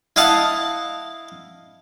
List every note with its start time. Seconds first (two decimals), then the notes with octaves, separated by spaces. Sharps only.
0.16 E4 D#5 F5 F#5 A5